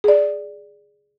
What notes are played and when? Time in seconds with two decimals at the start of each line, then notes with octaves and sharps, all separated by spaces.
0.04 G#4 D5